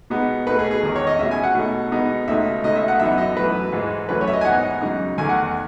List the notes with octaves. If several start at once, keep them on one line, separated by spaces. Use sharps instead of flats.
B2 G#3 B3 D#4
B2 A3 D#4 B4
G#4
G#4
E2 D#3 G#3 D#4
C#5
D#5
B2 G#3 C#4 E5
G#5
F#5
B2 A3 D#4
B2 G#3 B3 D#4
C#2 B2 A3 D#4 E5
C#2 B2 A3 D#4 D#5
E5
F#5
F#2 E3 B3 D#4 E5
D#5
F#2 E3 A3 B4
G#2 E3 G#3 D#4
F#2 E3 A3 C#4 B4
C#5
E5
D#5
G#5
G#2 E3 B3 D#4 F#5
F#2 C#3 G#3 D#4
E2 D#3 A3 G#5
F#5